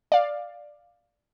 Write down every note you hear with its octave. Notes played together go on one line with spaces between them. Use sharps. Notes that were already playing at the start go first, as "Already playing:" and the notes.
D5 F5